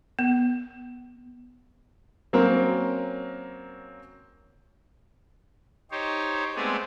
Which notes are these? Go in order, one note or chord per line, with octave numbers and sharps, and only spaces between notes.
B3
F#3 A#3 C4 C#4 A#4
D#4 G4 C5 C#5
G#3 A3 B3 C4 G#4 D5